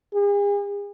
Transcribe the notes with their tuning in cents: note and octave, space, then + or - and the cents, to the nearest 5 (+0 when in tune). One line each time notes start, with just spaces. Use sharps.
G#4 -40